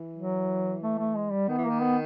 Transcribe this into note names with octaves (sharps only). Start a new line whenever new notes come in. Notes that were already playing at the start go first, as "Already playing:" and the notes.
Already playing: E3
F#3
A3
A3
G#3
G3
D#3 B3
E3
D#3 A#3
B3